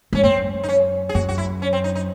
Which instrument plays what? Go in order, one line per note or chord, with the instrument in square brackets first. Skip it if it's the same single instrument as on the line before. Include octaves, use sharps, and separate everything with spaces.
[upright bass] G#2 [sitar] C#4
[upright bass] F#2 [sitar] C4
[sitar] D#4
C#4
G#4
[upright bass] F#2 [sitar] F#4
[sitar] F#4
E4
C#4
C4
D#4
D#4